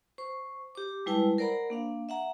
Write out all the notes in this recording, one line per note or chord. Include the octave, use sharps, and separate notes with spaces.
C5 C#6
G4 D6
G3 G#3 E4 B4 G5 A5
A#4 C5 D5 F#5 A#5 B5
A#3 D4 F5
E5 F#5 A#5